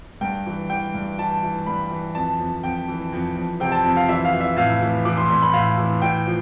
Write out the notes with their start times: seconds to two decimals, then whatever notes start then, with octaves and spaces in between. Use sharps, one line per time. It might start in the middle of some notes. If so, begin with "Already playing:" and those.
0.21 G2 G5
0.46 E3
0.70 E3 G5
0.94 G2
1.18 E3 A5
1.43 E3
1.66 G2 B5
1.91 E3
2.15 F2 A5
2.39 F2
2.63 F2 G5
2.88 E3
3.13 F2
3.36 F2
3.60 C3 G5
3.72 A5
3.84 F2
3.97 F5
4.08 E3 E5
4.25 F5
4.33 E3
4.41 E5
4.57 A2 F5
4.81 E3
5.05 E3 D6
5.17 C6
5.30 A2 C6
5.42 B5
5.53 A2 F5
5.78 E3
6.02 A2 G5
6.26 F3